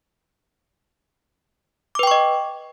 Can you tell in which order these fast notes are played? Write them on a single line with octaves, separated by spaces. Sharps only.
D6 B4 G5 C#6 D#5